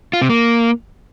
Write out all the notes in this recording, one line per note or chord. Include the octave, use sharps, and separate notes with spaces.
F4
C3
A#3